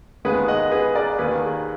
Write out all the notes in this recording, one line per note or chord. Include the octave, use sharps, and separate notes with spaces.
D#2 D#3 G#3 B3 G#4 B4
D#5 F#5
G#4 B4
A#4 D5
D#2 D#3 A#3 G#4 B4